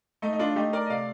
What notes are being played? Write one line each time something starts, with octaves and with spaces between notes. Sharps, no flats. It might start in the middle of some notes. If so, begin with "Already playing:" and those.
A3 D#4
D#4
D4 F4
A3 D#4 G4
A#4 D5
D#5
C3 D5 F5